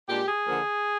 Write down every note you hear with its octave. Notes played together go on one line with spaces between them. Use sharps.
A#2 G#3 D4 G4
G#4
D3 F3 A#3